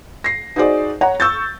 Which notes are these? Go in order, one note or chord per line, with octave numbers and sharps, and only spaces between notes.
A#6 C7
D#4 F#4 G#4 C5 D5
C#5 F#5 A#5
C#6 E6 G6 A6